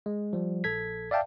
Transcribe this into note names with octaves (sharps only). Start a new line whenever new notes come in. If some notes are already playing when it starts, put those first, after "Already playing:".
G#3
F3 G3
A#1 A4 G#6 B6
D5 E5 F5 G5 A5